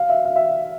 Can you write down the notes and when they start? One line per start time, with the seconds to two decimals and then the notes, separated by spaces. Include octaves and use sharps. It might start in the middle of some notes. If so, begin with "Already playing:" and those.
Already playing: F5
0.09 E5
0.25 F5
0.36 E5